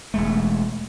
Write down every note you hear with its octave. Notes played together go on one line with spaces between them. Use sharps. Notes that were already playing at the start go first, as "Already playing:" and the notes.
E1 G#3 A3